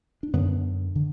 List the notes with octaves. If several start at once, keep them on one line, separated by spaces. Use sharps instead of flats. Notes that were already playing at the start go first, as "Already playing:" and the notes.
D4
F#2 D3 B3
D3